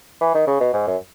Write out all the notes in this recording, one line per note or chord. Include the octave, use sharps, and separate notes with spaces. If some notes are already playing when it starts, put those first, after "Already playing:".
E3
D#3
C#3
B2
G#2
F#2